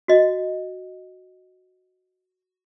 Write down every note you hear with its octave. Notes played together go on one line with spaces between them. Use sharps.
F#4 D#5